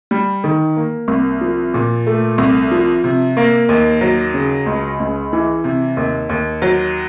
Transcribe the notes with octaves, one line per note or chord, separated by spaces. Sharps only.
G3
D#3
A#3
C2
F3
A#2
A3
C2
F3
C3
A#3
D#2
F#3
C#3
C#2
C#2
E3
C3
D#2
D#2
F#3